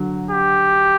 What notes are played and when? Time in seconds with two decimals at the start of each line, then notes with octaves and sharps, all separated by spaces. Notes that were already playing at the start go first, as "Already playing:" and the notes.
Already playing: D3 F#3
0.30 G4